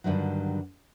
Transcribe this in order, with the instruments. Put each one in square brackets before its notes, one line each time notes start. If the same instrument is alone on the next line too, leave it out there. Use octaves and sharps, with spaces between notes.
[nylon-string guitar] G2 A#2 D3 D#3 F#3